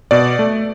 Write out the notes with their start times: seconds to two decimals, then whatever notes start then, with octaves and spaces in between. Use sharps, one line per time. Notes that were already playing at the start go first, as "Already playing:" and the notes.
0.11 B2 D5
0.39 A3